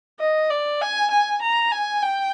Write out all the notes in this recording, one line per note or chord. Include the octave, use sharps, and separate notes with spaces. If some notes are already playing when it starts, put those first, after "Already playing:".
D#5
D5
G#5
G#5
A#5
G#5
G5